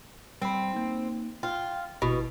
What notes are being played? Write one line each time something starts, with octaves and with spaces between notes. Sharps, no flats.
G3 C4 B5
A#3 D#4
F4 G5
G#1 B2 E4